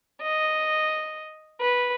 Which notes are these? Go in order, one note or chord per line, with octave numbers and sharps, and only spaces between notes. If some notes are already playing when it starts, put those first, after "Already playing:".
D#5
B4